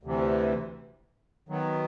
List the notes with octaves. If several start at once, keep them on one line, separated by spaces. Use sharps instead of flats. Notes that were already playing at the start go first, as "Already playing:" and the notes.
D2 C3 E3
D#3 F#3 B3